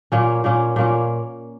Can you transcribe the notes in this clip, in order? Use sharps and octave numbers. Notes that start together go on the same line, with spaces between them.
A#2 A#3 C#4
A#2 A#3 C#4
A#2 A#3 C#4